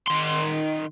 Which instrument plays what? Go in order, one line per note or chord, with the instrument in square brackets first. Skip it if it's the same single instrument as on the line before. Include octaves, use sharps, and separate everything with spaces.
[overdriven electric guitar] D#3 C6